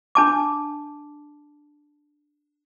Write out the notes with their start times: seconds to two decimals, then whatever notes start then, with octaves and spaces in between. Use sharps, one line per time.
0.15 D4 A5 D6